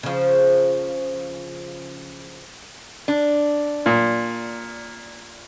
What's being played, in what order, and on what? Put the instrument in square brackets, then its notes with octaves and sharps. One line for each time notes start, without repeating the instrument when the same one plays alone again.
[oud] C#3 F3
[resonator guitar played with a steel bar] D4
[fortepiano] A#2